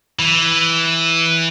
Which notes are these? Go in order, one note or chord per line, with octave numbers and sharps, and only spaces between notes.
E3